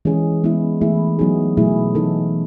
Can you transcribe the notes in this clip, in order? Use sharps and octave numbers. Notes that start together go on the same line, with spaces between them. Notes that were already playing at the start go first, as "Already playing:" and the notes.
E3 G#3 C#4 G#4
G#3 B3 E4
E3 A3 E4 G#4
F#3 B3 D#4 G#4
B2 F#3 A3 E4 G#4
E3 B3 D#4 A4